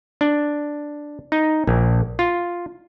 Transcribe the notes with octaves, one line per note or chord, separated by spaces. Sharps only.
D4
D#4
A#1
F4